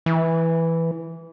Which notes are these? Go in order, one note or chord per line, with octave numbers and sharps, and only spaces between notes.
E3